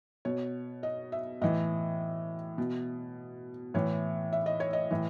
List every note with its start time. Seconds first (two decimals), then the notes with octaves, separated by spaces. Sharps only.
0.25 B2 C#5
0.83 D#5
1.12 E5
1.42 A2 E3 D#5
2.58 B2
3.74 A2 E3 C#5
4.33 E5
4.46 D#5
4.60 C#5
4.73 D#5
4.91 A2 E3